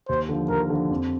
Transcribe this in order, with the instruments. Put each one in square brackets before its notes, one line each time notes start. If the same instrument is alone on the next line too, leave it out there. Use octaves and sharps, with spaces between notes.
[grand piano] D#2 [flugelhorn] C5
[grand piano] D3 F3
[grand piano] D#2 [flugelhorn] A#4
[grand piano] D3 F3
F2